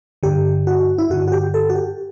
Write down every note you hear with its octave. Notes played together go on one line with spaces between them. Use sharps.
G2 D3 G4
F#4
E4
G2 D3 F#4
F#4
G4
A4
F#4
G4